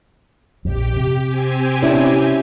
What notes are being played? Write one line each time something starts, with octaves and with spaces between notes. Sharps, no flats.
A#1 F2 G4
C3
C4 G4 G#5
C#4 D4 E4